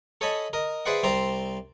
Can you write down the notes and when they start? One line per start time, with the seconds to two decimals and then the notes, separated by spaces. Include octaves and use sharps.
0.21 A4 C#5 D#5 G#5 A5 B5
0.53 A#4 D#5
0.86 G#4 B4 C5 D5 E5 F#5
1.03 C2 C4 C5 D5 A#5 C6